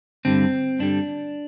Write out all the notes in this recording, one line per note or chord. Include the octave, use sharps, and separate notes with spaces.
G2 D3 G3 C4
G2 D3 G3 D4